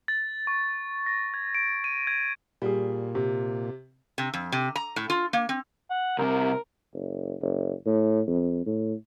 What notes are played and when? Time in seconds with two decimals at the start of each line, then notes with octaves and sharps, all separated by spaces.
0.08 A6
0.47 C#6
1.06 A#6
1.34 G#6
1.55 D7
1.84 D#7
2.07 G#6
2.62 A#2 G3 G#4
3.15 C3
4.18 C3
4.34 F2
4.52 C3
4.76 A#5
4.96 A2
5.10 F4
5.33 A#3
5.49 C4
5.90 F#5
6.18 C2 C3 A#4
6.93 F#1
7.41 F#1
7.85 A2
8.27 F2
8.66 A2